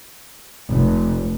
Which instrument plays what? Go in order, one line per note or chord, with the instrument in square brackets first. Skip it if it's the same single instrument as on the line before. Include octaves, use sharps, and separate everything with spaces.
[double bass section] F1